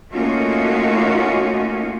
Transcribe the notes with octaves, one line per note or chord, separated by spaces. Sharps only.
A3 A#3 C#4 D#4 F4 F#4